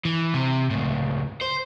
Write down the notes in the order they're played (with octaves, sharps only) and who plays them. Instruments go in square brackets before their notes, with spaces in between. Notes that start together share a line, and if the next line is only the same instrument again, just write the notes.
[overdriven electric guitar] E3
C3
C#2 A2
C5